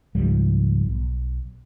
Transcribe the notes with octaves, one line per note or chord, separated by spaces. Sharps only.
C#2 G#2 F3 G3
B1